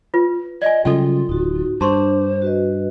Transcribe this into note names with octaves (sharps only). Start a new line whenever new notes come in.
F4 B4
D5 D#5 G#5
C#3 F#3 G3 F4 A4 G5
D1 D#4 F#4
G2 D4 C5 A5 C6 C#6
F#4 B4 D#5